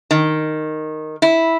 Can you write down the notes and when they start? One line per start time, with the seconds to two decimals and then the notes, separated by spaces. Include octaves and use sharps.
0.11 D#3
1.22 E4